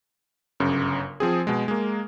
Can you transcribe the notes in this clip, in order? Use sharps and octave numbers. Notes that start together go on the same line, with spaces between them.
G1 F#2 C#3
F3 C4 G#4
B2 G#3
G#3 A#3